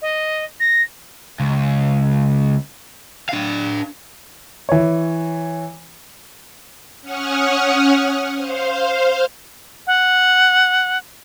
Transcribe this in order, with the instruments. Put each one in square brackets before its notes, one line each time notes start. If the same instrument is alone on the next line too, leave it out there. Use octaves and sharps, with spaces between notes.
[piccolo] D#5
A#6
[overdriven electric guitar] C#2
D4 F5
[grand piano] E3 C#5
[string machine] C#4 F#5 C#6 D#6 F6
C5 F5
[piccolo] F#5